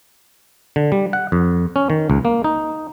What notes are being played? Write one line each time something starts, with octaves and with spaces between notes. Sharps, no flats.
D3
G3
F#5
F2
C#4
D#3
C#2
A#3
D#4